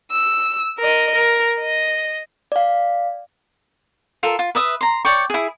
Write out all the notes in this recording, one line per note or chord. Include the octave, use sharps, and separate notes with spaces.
E6
A#4 D#5
A#4
D#5
D5 F5
F4 A4 A#4
F4
B4 E5 D#6
A#5 C6
C#5 D5 G5 C#6
E4 G#4